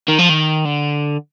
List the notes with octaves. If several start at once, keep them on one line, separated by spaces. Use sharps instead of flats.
D#3
F3
D#3
D3